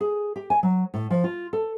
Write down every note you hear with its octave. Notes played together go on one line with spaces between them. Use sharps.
G#4
G4
G#5
F#3
A2
F3
F4
A4